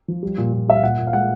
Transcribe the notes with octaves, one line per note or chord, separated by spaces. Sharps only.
F3
G3
A#2
A#2
G3 E5
F5
A#2 F#5
A#2
F5
G#3 F#5